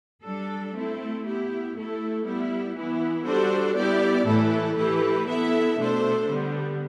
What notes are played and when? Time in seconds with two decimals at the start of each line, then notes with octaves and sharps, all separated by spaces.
0.23 G3 D4 A4
0.74 A3 C4 E4 A4
1.25 B3 E4 G4
1.75 A3 E4 A4
2.25 G3 B3 E4
2.76 E3 B3 E4
3.25 G3 D4 F#4 A4 C5
3.76 G3 B3 E4 G4 D5
4.26 A2 E3 A3 E4 A4
4.76 E3 A3 E4 G4 B4
5.27 B3 E4 A4 E5
5.77 B2 A3 D4 A4 C5
6.27 D3 G3 B3